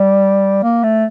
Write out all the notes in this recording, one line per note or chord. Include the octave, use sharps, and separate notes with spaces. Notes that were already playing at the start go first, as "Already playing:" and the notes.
Already playing: G3
A#3
A3